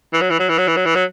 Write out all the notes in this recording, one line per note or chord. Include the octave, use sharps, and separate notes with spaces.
E3
F#3
E3
F#3
E3
F#3
E3
F#3
E3
F#3